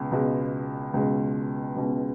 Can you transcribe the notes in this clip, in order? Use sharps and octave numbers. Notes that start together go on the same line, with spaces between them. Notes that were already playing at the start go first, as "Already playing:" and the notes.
Already playing: C#2 B2
C#2 B2 G#3
C#2 B2 G#3
C#2 B2 G#3